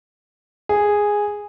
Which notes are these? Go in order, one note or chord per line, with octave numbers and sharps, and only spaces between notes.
G#4